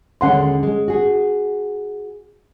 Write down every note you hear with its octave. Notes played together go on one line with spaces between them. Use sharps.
D#2 D3 G#3 C#4 F#5 C6
G#3
F#4 G#4